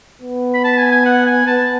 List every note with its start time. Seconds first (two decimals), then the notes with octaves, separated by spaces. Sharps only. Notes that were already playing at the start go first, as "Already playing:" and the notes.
0.22 B3
0.54 B5
0.64 A5
0.78 G#5
0.92 G#5
1.06 F#5
1.26 G#5
1.47 B3 A5